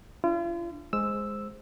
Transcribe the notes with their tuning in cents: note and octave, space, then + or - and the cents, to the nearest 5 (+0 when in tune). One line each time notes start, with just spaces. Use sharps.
D4 +0 F4 -40
G#3 +0 C5 +0 E6 +0